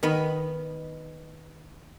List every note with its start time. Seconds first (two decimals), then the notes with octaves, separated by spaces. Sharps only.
0.03 D#3 B3 D#5 B5